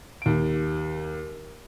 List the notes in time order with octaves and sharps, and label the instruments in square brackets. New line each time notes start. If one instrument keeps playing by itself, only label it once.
[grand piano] D#2 D7